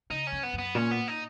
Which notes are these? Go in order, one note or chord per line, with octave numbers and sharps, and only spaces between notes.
C#3 D#4
C#4
F#2
B3
F#2
B3
A#2 C#4
B3
D#4